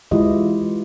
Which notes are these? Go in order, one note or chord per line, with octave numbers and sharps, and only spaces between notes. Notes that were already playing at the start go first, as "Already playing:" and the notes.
E3 G#3 E4 F4 G4 D#5